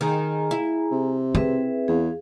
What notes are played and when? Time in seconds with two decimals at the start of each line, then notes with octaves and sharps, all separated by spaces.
0.01 D#3 G#4 G#5 A#5
0.51 E4
0.91 C3
1.35 C4 G#4 B4 E5
1.88 E2 G#4 F5